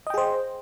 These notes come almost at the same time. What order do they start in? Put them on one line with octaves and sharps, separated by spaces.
D#5 G5 G#4 C5